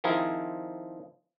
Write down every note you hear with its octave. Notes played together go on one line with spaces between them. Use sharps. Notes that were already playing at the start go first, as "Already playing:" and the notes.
D#3 F3 C4 E4 G#4 A#4